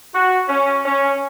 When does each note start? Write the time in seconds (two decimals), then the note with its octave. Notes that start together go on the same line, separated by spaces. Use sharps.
0.14 F#4
0.48 C#4
0.85 C#4